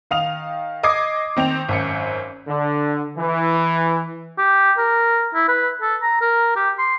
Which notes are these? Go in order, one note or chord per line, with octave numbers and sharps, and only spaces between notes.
D#3 F5 D#6 F7
D#5 D6 D#6 G#6 C7
D#3 C4 G6 F7
G#1 F#2 C#7
D3
E3
G4
A#4
E4
B4
A4
A#5
A#4
G4
C6